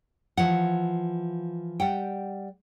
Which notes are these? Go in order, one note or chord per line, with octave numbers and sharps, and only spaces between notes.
E3 F3 F#5
G3 F#5 G5